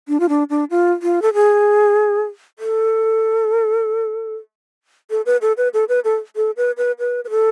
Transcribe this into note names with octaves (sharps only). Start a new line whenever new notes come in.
D4
F4
D4
D4
F4
F4
A4
G#4
A4
A4
B4
A4
B4
A4
B4
A4
A4
B4
B4
B4
B4
A4